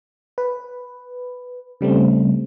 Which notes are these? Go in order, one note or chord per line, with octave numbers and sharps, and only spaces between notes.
B4
C#3 G3 A3 C4